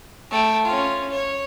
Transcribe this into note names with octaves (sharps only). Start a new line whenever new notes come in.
A3 G5
C#4 F4
C#5